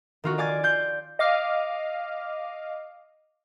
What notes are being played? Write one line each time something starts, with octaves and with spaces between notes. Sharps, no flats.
D#3 F4 F#4
D5 F5 G#5 D6 G#6 A6
F4 G6 C7
D#5 F5 D6 F6